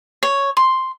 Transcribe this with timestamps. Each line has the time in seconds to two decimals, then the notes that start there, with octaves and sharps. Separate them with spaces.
0.23 C#5
0.57 C6